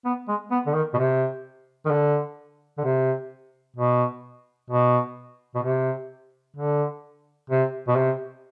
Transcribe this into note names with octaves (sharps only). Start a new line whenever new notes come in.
B3
G#3
B3
D3
D#3
B2
C3
D#3
D3
D3
C3
B2
B2
B2
C3
D3
C3
B2
C3